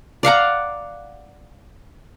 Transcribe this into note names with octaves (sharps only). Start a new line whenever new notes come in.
D5 F5 F#5 A#5